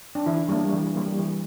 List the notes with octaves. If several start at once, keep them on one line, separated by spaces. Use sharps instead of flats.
D4
E3 E4
G3 A#3 D4
E3
G3 A#3
E3